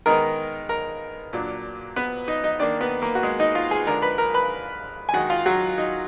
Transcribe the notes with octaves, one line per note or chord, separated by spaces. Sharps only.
D#3 G#3 B3 D#4 A#4 A#5
A#4 A#5
A#2 F#3 D4
B3 B4
D#4 D#5
D#4 D#5
D#3 A#3 D4 D#4 D5
B3 B4
A#3 A#4
F#4
G#3 G#4
D#4 D#5
F4 F5
G#4 G#5
D3 F3 G#3 D4 A#4 A#5
B4 B5
A#4 A#5
B4 B5
G#5
D#3 G#3 D#4 F#4 F#5
F4 F5
F#3 F#4
D#4